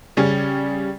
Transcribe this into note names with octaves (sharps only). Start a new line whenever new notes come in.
C#3 G3 C#4